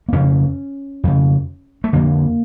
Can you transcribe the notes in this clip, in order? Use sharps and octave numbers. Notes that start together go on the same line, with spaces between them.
A#3
F2 C#3 C#4
F2 C#3
A3
F2 D3 A#3